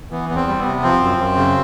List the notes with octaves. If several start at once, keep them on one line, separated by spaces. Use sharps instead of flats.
E3 B3
E2 B3
C4
G3
B3
C3
F3 C4
F#2
F#2
C#3